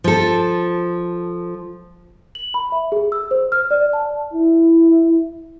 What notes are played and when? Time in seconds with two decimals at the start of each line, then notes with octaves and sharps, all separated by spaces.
0.04 F3 A4
2.35 F#7
2.54 B5
2.72 E5
2.92 G#4
3.12 E6
3.31 C5
3.52 F6
3.71 D5
3.93 A5
4.33 E4